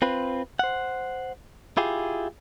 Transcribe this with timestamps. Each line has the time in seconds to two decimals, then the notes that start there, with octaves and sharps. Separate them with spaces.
0.02 C4 F4 B4
0.59 C5 F#5
1.77 E4 F4 G4 G#4